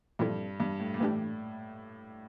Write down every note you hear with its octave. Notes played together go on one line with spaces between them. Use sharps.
G2 A#2 F3 C4 E4 A4
G2
A2
A#2
A2 E3 A3 D4 G4